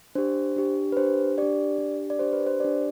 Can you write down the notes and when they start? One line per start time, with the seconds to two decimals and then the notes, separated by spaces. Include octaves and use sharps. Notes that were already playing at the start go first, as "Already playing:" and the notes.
0.15 D4 G4 C5
0.56 D4 G4
0.92 B4
0.97 D4 G4 C5
1.38 D4 G4 D5
1.79 D4 G4
2.10 D5
2.19 D4 G4 C5
2.33 B4
2.47 C5
2.60 D4 G4 D5